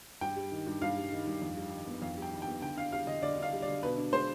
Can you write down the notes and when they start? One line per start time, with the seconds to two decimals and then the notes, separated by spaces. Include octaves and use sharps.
0.21 G2 G5
0.36 G3
0.52 D#3
0.67 G2
0.82 G2 F5
0.96 G3
1.12 D#3
1.27 G2
1.42 F2
1.57 G3
1.72 D#3
1.87 B3
2.02 F2 F5
2.17 G3
2.22 G5
2.32 D#3
2.42 G5
2.47 B3
2.62 D3 G5
2.77 D4 F5
2.92 G3 F5
3.07 D3 D#5
3.22 D3 D5
3.38 D4 F5
3.53 G3
3.62 D5
3.68 D3
3.83 B2 B4
3.98 D4
4.12 G#3 C5